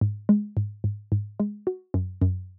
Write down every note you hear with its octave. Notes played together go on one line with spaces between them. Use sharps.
G#2
G#3
G#2
G#2
G#2
G#3
F#4
F#2
F#2